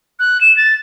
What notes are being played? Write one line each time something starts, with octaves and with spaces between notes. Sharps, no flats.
F#6
E7
A6